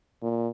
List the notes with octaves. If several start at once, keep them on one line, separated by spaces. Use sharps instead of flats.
A#2